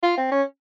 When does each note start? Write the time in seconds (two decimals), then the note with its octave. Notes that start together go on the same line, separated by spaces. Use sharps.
0.03 F4
0.18 C4
0.32 C#4